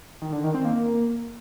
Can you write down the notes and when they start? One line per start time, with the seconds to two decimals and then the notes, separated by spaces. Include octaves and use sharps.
0.22 D#3
0.32 D3
0.44 D#3
0.54 C4
0.65 A#3